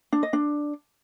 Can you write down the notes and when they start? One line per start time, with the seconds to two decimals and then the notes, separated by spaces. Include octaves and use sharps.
0.13 D4
0.23 D#5
0.33 D4